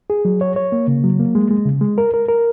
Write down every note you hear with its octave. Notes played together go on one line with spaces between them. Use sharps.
G#4
F#3
C#5
C#5
A#3
C#3
F#3
A#3
G#3
G#3
C#3
G#3
A#4
A#4
A#4